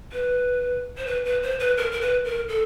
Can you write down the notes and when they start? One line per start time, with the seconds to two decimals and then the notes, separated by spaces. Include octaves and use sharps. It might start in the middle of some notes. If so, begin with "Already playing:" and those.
0.12 B4
0.97 C5
1.06 B4
1.25 B4
1.43 C5
1.60 B4
1.77 A#4
1.92 A#4
2.01 B4
2.25 A#4
2.49 A4